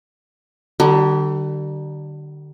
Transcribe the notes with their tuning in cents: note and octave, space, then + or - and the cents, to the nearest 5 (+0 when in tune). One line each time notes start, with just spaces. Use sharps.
D3 +25 G3 -40